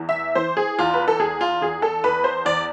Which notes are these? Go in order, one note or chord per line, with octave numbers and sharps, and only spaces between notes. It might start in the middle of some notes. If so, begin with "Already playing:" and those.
Already playing: E2 E3
E5
E3 C5
G#4
E2 F4
B4
A4
E2 G#4
F4
E2 G#4
A4
E2 B4
C5
E2 D5